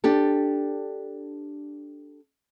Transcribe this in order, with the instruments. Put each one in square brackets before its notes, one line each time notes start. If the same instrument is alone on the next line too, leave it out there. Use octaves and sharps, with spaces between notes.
[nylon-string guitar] D4 G4 A4